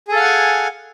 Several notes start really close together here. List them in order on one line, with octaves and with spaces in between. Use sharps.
G#4 A4 F5 F#5 G#5